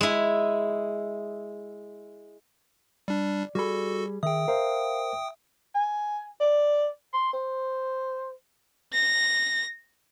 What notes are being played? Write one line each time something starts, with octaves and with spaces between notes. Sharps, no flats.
G#3 E4
G3 D4 D5
G3 F#4 G#4 A4 B5
D#3 G#4 E5 G5 D#6
A#4 C5 F5
G#5
D5
C6
C5
A#6